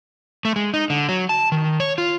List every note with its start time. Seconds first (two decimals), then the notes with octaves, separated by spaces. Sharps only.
0.45 A3
0.56 G#3
0.74 D#4
0.90 D3
1.09 F#3
1.29 A5
1.52 D#3
1.80 C#5
1.98 F4